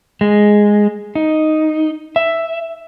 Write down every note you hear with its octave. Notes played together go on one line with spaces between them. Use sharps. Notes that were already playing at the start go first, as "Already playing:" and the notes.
G#3
D#4
E5